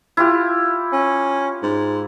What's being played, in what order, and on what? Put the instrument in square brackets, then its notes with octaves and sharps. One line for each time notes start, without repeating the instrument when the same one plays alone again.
[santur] E4 F4 G4
[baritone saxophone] C#4
G#2